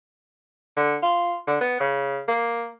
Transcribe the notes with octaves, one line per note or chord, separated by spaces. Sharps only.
D3
F4
D3
B3
C#3
A#3